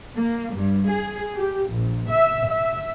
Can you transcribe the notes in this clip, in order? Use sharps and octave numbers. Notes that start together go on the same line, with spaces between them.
A#3
G2
G#4
G4
A#1
E5
E5